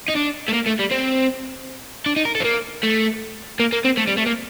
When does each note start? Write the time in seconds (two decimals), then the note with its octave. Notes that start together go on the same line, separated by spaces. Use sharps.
0.08 D#4
0.15 D4
0.48 A3
0.53 A#3
0.66 A3
0.79 G3
0.91 C4
2.06 D4
2.16 D#4
2.25 A#4
2.35 A4
2.40 C4
2.44 A#3
2.83 A3
3.60 A#3
3.73 A#3
3.85 C4
3.98 A3
4.08 G3
4.18 A3
4.27 A#3